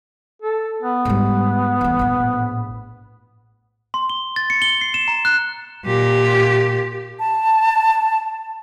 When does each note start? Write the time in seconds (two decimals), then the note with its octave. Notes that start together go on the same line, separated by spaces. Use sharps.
0.42 A4
0.82 B3
1.05 G#2 G3
1.81 E2 A2
1.99 A#1 A2
3.94 C6
4.10 G7
4.36 A6
4.50 C#7
4.62 G7
4.81 C7
4.94 E7
5.08 A#5
5.25 F#6
5.86 A#2 G4
7.20 A5